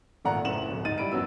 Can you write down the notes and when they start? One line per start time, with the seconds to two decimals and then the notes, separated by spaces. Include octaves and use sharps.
0.25 G#1 A#2 A3 D5 F#5 A#5
0.44 F#1 A2 E7 F#7
0.71 D1
0.85 G#2 D#4 A6 D#7
0.98 G3 E4 B5 D7
1.12 G1 F#2 F#3 B3 E6